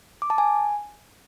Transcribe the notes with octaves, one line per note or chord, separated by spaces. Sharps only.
D6
A5
G#5